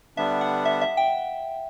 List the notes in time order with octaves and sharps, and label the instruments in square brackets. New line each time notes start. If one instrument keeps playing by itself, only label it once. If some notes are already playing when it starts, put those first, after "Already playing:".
[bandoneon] D3 G3 B3 D4 [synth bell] E5
[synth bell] F#5
E5
E5
G5